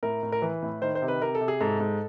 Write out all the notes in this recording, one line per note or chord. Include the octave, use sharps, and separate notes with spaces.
A2 A#4
A2
A#4
E3 B4
A2
D#3 C5
C5
C3
B4
C3 A#4
A4
C3
G#4
G#2 A4
G#2